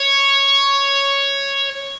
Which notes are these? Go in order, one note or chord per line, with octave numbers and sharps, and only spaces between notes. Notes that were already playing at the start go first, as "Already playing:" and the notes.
Already playing: C#5